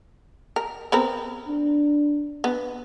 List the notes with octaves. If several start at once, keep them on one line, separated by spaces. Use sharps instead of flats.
A#4
B3 C4 A#4
D4
B3